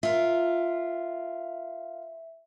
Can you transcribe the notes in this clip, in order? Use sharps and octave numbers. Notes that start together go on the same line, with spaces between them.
F4 A#4 E5